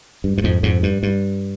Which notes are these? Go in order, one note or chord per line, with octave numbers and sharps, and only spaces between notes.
G2
G2
F2 G#2
F2 G#2
G2
G2